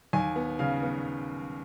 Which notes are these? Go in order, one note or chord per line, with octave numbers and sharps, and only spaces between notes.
D#2 G#5
B3
C#3 F5
B3